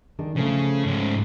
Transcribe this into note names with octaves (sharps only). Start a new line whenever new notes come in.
D#3 D4 G#4
C#3 F3 A3 A5
G#2 C#4